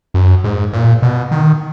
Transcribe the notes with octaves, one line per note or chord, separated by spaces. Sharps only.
F#2
G#2
A#2
B2
D#3